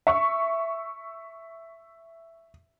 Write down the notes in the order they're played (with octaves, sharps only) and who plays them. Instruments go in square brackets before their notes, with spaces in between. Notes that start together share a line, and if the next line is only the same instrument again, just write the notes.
[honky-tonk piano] E5 C#6